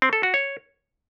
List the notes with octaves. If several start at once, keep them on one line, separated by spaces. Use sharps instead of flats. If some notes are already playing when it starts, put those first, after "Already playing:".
C4
A4
F#4
C#5